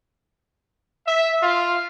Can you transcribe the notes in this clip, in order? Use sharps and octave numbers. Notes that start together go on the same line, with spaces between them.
E5
F4